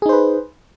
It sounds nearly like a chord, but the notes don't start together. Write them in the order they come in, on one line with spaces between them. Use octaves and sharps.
G#4 D#4 C5 B4